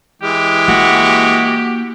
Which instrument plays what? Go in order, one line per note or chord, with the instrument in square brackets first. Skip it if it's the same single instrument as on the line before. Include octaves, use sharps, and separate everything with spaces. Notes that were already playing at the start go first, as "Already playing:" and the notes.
[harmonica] E3 G#3 [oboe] G4
[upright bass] A#3 [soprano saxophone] F#4